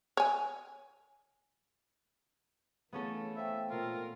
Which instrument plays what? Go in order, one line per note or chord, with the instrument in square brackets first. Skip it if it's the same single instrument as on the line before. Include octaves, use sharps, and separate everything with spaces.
[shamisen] C#5 G#5
[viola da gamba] E3 A3 [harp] B3 C#4 A4 [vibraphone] G#4 F5
[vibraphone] C5 F5 G5 [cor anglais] E5
[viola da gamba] A#2 A#4 [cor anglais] F4